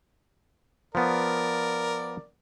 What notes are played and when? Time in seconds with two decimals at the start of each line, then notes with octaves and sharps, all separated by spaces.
0.95 F3 B3 A#4 D5